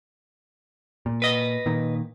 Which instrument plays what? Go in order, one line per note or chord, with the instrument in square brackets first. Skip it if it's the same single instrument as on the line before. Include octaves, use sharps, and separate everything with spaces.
[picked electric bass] A#2
[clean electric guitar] B4 D#5
[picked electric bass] A#2 D#3